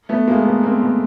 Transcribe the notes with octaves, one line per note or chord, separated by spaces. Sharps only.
A3 B3
G#3 A#3
A3 B3
A#3 C4
A3 B3